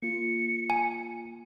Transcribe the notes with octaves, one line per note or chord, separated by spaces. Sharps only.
A#3 F4 C#7
G#5